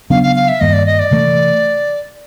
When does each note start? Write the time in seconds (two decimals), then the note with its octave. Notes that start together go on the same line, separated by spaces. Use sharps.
0.10 C#3 F#3 B3 D4 F5
0.23 F5
0.36 F5
0.48 E5
0.61 G2 D#3 G3 A#3 D#5
0.73 D5
0.86 D#5
0.99 D5
1.11 C3 E3 A3